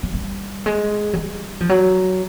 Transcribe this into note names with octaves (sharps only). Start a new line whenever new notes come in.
F#3
G3
G#3
F#3
G3
F3
F#3